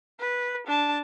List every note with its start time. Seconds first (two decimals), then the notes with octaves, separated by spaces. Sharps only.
0.20 B4
0.67 D4 A5